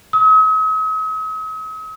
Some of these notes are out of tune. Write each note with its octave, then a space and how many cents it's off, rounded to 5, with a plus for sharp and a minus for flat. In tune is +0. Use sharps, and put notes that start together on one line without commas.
D#6 +45